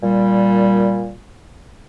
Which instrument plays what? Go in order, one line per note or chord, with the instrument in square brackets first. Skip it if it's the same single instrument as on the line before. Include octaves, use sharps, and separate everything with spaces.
[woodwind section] A#2 G3